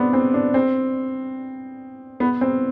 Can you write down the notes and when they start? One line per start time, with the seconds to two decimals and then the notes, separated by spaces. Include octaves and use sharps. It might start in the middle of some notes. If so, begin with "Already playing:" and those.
Already playing: B3 C4 D4
0.13 C4
0.34 D4
0.54 C4
2.20 B3
2.41 C4